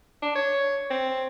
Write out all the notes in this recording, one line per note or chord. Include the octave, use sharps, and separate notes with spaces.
D4
C#5
C4